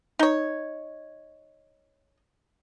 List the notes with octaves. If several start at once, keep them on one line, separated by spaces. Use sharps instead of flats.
D#4 C#5